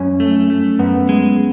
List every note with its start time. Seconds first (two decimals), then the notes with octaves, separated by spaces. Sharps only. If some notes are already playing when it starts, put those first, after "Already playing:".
Already playing: F#2 C#4
0.20 A3
0.50 A3
0.79 F#2 B3
1.09 G#3